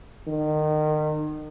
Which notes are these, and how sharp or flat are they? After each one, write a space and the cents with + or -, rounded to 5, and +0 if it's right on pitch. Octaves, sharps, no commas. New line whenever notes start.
D#3 -30